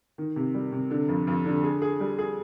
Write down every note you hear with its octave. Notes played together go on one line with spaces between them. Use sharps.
D#3
C3
G3
C3
D3
F2
F2
D3
G#4
G#4
G3
G#4